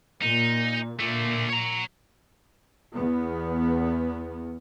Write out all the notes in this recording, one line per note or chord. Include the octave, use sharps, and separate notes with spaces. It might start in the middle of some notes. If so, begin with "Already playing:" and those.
A#2 D#4
A#2 D3 A3
C#5 A#5
E2 B3